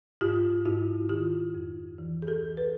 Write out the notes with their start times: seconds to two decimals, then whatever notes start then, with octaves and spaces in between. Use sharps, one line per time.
0.21 G#2 F4 G4
0.65 G#2 E4 F#4
1.09 D#3 F4 G4
1.55 F2
1.98 E3
2.22 G#4
2.27 G4 A4
2.42 D2
2.57 A4 B4